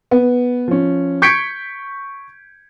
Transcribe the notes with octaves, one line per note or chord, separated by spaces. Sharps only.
B3
F3 C#4
C#6 G6 G#6 B6 C#7 D7